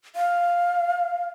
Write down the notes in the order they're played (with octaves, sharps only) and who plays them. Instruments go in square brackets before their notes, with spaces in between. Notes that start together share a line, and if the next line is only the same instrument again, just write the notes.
[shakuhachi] F5